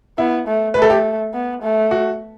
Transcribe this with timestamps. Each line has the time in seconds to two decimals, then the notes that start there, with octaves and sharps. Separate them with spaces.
0.18 B3 E4
0.47 A3
0.74 A3 B4
0.82 A4
0.90 G4
1.34 B3
1.62 A3
1.91 F#4